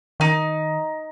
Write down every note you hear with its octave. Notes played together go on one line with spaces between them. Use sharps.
D#3 D#4